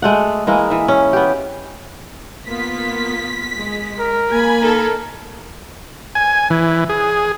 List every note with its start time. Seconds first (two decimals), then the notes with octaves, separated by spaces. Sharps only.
0.02 G#3 A3 F#5
0.47 E3 G#3 A#3 E4
0.70 E3 E5
0.88 C#4
1.13 B3 G4
2.46 A#3 B3 F4 B6
3.56 G#3
3.99 A#4
4.31 A#3 G#5 B5
4.61 D#4 A4 A#4
6.15 G#5
6.50 E3
6.89 G#4